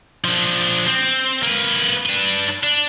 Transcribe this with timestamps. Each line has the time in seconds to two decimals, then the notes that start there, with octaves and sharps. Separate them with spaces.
0.25 F3 D4
0.87 C4
1.42 A#3 B4
2.06 D4 B4
2.64 D4